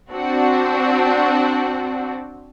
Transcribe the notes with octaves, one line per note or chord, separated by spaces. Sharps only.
C4 D4 F#4